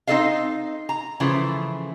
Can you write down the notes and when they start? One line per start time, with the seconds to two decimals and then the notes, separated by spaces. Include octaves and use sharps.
0.07 C4 D#4 G#4 A4 D#5 F5
0.89 A#5
1.20 C#3 E3 F3 A3